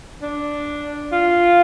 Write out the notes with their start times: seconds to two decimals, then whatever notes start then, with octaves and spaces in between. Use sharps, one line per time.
0.22 D4
1.12 F4